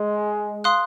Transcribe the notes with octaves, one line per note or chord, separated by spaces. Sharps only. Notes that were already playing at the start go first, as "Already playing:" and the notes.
Already playing: G#3
F5 C6 D#6 F#6